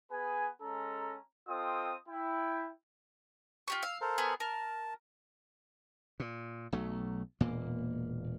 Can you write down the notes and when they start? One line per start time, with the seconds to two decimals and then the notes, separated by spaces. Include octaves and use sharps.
0.11 B3 G#4 B4 G#5
0.62 G#3 C#4 A4 A#5
1.49 C4 F4 A4 D#5 G5 D#6
2.09 E4 G5
3.68 F4 G4 C#6
3.83 F5 E6
4.01 A4 A#4 C5
4.18 B3 G#4
4.40 A#4 A5
6.20 A#2
6.72 B1 F#3 A3
7.41 E1 A#2 A#3